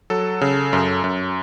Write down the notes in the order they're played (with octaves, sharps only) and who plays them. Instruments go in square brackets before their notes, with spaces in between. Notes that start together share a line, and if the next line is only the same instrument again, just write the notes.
[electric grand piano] F#3 A4
C#3
F#2
F#2